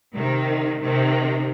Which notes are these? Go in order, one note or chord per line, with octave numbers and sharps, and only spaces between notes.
C3 D#3
C3 D#3